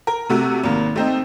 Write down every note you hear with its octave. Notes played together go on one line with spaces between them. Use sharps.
A#4
C3 A3 F#4
G#1 A#3
A3 C4 D#4